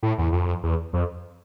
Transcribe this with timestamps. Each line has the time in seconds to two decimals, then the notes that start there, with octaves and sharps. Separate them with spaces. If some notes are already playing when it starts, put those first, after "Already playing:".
0.03 A2
0.18 E2
0.33 F2
0.63 E2
0.93 F2